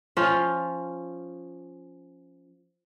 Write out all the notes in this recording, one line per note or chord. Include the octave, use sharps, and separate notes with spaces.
F3 C#4 F4